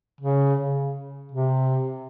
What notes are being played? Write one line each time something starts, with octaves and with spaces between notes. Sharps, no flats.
C#3
C3